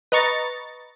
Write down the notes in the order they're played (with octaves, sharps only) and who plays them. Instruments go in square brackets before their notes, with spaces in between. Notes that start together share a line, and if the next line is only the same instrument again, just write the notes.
[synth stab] B4 D#5 A#5 C#6 A6